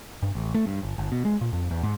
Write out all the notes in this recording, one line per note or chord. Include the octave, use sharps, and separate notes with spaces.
G2
A1
A3
G2
G1
G1
B2
G#3
A#2
F2
E2
G#2